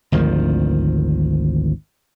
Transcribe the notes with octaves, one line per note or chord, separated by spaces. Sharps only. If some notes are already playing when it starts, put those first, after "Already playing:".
G#1 D2 D#3 F3